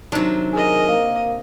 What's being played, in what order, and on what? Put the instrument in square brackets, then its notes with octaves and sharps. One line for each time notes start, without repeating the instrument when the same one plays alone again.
[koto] C3 D4 [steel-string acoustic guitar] D#3 F#3
[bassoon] G#4 [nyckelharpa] A#4 D#5
[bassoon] A#3